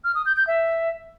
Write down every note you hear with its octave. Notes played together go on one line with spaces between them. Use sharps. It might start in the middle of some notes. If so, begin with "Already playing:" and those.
F6
D#6
G6
G6
E5